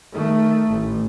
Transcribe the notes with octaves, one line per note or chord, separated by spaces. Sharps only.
D#3 A3
A1